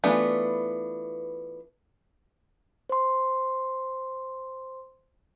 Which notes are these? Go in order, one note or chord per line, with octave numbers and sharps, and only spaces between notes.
E3 A3 B3 D4 F4
C5 C6